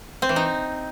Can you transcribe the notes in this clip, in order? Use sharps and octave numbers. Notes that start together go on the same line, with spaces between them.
C4
E3
D#4